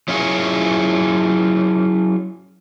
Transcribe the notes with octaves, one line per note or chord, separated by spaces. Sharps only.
F#3 C#4 E4 F4 G#4 C#5